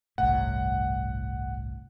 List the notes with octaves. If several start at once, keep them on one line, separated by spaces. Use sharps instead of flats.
G1 C2 A2 F#5